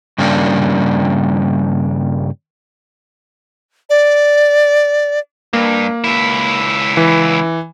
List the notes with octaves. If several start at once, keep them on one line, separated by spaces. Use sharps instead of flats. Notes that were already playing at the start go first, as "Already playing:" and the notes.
G2 C#3 G3 A#3 D4
D5
G2 A#3
C#2 E4
E3